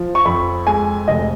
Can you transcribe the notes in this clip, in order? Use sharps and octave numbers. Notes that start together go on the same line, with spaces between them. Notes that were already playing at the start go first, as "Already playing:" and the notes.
Already playing: F3
C#6
F2 B5
G#3 G#5
F1 D#5